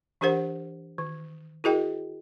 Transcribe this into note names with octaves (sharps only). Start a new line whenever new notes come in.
E3 D4 G4 A#4 C5 F#5
D#3
E4 F#4 G#4 A#4 D#5 G5